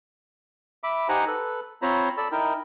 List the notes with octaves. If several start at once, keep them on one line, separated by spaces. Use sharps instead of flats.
E5 B5 D6
D#4 G4 C5 F#5 G#5 A#5
A4 B4
C4 F4 C5 C#5 A#5 B5
A4 D5 B5 E6
D#4 E4 A#4 G5